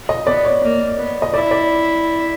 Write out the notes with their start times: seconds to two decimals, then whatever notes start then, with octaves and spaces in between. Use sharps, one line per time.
0.09 D#5
0.26 B3 D5
0.45 C#5
0.63 A#3
0.98 B3
1.22 D#5
1.33 E4 D5
1.51 D5